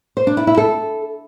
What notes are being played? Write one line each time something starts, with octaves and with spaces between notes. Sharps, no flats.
C5
D4
E4
E4
A4